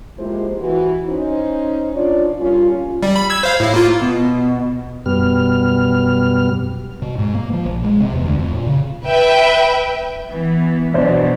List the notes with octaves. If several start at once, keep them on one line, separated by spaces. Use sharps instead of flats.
F3 G#3 A#3 E4 G4 C5
E3 E4 F#4
C#4 D#4 C5
F3 D4 F4 C#5 D5
G3 A#3 C#4 F4
G3
B5
E6 G#6
C5 F5
A2 E4
A#3 F4
B2
F#2 B2 G3 B3 F6
B2
G#2
A#3
F3
A#1
G#3
C3
E2
D2
F2
A#2
C#3
B4 E5 G5
E3 B3
B2 E3 F#3 D4 C5